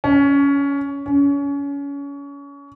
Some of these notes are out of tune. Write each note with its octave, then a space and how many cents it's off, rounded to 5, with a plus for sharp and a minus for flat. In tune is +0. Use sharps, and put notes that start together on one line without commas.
C#4 +20
C#4 +30